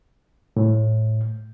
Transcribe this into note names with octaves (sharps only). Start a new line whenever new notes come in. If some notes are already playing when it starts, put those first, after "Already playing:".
A2